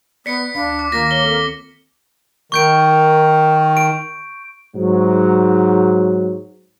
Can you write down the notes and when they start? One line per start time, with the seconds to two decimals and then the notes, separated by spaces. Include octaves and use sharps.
0.26 B3 D5 B6 C#7
0.55 D2 D4 F5 B5
0.79 D6
0.92 D#3 A#3 F4 A#6
1.11 C#5 G7
1.24 C4 A4
2.52 D#3 C#6 G6 D7
3.77 D7
4.76 G#2 F#3